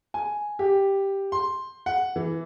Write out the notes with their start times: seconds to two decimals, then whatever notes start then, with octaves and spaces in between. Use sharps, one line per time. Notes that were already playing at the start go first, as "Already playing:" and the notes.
0.14 G#5
0.59 G4
1.32 C6
1.86 F#5
2.16 E3